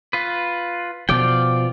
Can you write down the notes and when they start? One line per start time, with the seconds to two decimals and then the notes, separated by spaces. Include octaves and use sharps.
0.13 F4 B4
1.09 B2 F3 F4 D5 G5